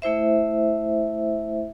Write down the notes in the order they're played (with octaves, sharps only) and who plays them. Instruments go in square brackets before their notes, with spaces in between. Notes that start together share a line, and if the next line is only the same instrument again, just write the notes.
[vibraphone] A3 E4 C5 E5